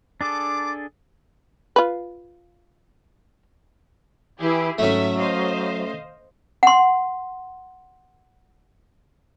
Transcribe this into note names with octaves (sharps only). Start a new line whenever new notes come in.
D4 G#4 A4 D6
F4 B4
E3 E4 G4 G#4
G#2 F#3 A3 C#4 E5
C5 D#5 F5
F#5 C6